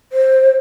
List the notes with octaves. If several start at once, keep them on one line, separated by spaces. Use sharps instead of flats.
C5